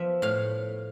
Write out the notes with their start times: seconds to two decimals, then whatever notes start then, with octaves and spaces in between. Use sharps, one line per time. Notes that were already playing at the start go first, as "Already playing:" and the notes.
Already playing: F3 B3 E5
0.22 A2 F5